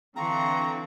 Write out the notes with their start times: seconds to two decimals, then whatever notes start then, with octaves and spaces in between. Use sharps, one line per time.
0.16 D3 E3 C4 F5 A#5 C6 C#6